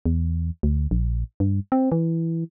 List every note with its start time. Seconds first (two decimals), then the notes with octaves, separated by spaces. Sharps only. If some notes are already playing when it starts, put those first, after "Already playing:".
0.06 E2
0.63 D2
0.91 A#1
1.40 G2
1.72 C4
1.92 E3